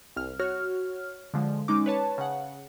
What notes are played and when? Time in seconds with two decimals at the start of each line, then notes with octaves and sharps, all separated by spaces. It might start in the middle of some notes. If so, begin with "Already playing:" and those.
0.16 C2 F6
0.39 F#4 C#5 F6
1.34 D3 F3 G#3
1.68 G#3 C#4 D#4 D6
1.86 B4 C#5 A5
2.18 C#3 F#5